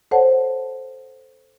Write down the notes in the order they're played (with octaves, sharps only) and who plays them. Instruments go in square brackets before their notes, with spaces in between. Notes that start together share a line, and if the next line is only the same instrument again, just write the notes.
[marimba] A4 C5 C#5 F#5 A5